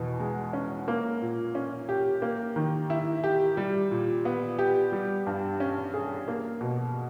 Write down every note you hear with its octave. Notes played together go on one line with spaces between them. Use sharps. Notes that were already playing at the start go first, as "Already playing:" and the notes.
Already playing: E2 B2
G#3
C#4
A#3
A#2
C#4
G4
A#3
D#3
E4
G4
G3
A#2
B3
G4
G3
G2
C#4
G#4
A#3
B2